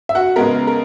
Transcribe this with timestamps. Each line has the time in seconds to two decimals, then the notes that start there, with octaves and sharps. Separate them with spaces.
0.09 E5
0.15 F#4 F#5
0.36 C#3 G#3 B3 A#4
0.67 A#4